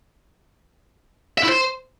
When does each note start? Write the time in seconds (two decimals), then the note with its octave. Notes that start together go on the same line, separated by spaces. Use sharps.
1.38 E5
1.43 E4
1.49 C5